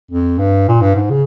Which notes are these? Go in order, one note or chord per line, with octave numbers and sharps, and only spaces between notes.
F2
G2
A#2
G2
G#2
C#3